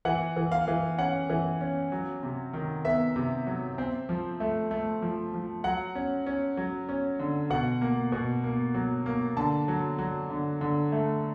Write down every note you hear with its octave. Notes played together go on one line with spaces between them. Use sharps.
E3 F#5
E3
F5
E3
C#4 F#5
E3
C#4
F#3
C3
D#3
B3 E5
C3
F#3
C4
F3
A3
A3
F3
F3
F#3 F#5
C#4
C#4
F#3
C#4
D3
B2 F#5
A#3
B2
A#3
F#3
A#3
D3 A5
F#3
F#3
D3
D3
A3